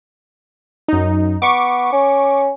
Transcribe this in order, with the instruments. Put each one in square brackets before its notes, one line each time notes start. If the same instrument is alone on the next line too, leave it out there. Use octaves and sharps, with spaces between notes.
[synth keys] F#2 D#4
[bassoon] B3 [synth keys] C#6 D6
[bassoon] C#4